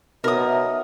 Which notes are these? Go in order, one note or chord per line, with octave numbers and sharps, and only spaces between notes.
B2 F#3 D#4 A#4 E5 D#6